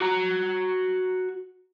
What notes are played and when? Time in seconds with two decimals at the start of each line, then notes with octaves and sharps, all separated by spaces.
0.01 F#4 A#5